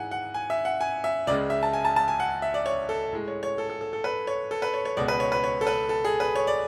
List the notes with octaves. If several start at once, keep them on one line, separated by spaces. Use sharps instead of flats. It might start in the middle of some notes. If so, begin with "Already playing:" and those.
Already playing: G#2 E3 G#3 F#5 G#5
F#5
G#5
E5
F#5
G#5
E5
C#2 C#3 G#3 D5
E5
A5
G#5
A5
A5
G#5
F#5
E5
D5
C#5
A4
A2 G#3
C#5
C#5
A4
A4
A4
A4
B4
C#5
A4
B4
C#5
C#5
C#2 B2 G#3 D5
B4
C#5
B4
C#5
A4
B4
A4
G#4
B4
C#5
D5